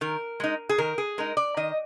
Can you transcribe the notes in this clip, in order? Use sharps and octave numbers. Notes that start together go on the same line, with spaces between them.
D#3 A#4
G#3 D#4
G#4
D#3 A#4
G#4
G#3 D#4 A#4
D5
D#3 D#5